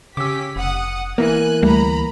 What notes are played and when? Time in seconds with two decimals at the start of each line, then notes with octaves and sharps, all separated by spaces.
0.17 C#3 C#4 G4 D6 E6 B6
0.56 F1 F#5 D#6
1.18 E3 A#3 B3 G#5 F#6
1.63 D2 G3 A3 A#5 B5